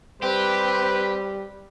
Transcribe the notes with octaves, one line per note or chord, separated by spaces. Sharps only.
G3 C4 G4 B4